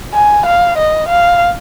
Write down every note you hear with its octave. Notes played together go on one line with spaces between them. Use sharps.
G#5
F5
D#5
F5